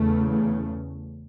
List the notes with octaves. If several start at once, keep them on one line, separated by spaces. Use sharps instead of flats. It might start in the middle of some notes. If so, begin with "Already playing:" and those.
Already playing: E2 C#3 A3
A3